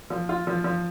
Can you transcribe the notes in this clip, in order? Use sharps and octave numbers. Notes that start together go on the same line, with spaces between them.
F3
F4
F3
F3